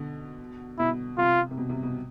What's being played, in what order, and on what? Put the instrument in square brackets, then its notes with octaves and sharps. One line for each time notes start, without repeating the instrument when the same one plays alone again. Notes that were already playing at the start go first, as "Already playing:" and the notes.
Already playing: [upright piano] B2 D3
[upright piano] B2 [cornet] E4
[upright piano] C3 [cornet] F4
[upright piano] C3
B2
C3
B2